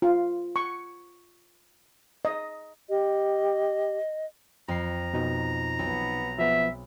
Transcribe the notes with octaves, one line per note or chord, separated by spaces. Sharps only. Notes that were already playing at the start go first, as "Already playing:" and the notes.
F4
C#6
D#5
G4 D#5
F2 A#5 C7
B2 D#4
B1 B3
F3 B3 E5